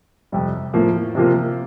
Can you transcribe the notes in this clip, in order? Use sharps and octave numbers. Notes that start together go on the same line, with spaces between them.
F2 C3 G3
A2 F3 A#3
C3 F3 A#3 F4